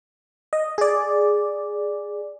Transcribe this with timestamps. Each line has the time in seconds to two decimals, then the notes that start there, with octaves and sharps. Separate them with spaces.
0.53 D#5
0.78 G#4 D5